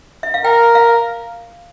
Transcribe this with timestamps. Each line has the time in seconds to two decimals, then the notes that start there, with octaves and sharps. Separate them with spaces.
0.23 E5
0.34 F5
0.44 A#4 G5
0.75 F5